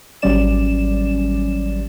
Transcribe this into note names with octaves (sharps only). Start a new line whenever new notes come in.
G#1 F#3 G3 C#4 D5 E7